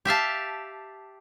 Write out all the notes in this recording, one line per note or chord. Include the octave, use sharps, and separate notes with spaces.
G4 E5 F5 A5